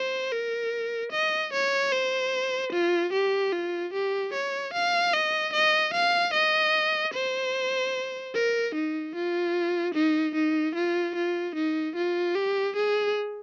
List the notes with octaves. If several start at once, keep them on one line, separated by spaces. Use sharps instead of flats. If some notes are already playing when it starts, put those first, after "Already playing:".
Already playing: C5
A#4
D#5
C#5
C5
F4
G4
F4
G4
C#5
F5
D#5
D#5
F5
D#5
C5
A#4
D#4
F4
D#4
D#4
F4
F4
D#4
F4
G4
G#4